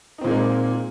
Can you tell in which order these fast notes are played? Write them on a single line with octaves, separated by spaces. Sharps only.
D#4 C4 A#2 G#3 A#3